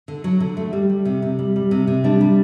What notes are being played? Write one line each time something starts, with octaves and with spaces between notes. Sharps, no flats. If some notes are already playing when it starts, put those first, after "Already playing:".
D3
F#3
D3
A3
G3
G3
C3
C3
G3
G3
C3
C3
G3 D4
G3